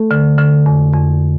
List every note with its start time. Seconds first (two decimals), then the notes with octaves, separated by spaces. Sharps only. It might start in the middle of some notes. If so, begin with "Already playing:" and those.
Already playing: A3 A4
0.11 D3
0.38 D3
0.66 F2
0.93 F2